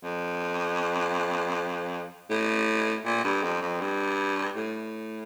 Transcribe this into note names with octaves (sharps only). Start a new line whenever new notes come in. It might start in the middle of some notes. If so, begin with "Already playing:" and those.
F2
A2
A#2
G2
F2
F2
G2
A2